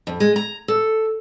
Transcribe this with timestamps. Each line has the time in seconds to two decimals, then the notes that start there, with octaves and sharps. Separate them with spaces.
0.07 F2
0.20 G#3
0.36 A#5
0.68 A4